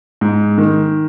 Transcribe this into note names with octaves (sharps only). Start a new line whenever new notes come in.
G#2
D#3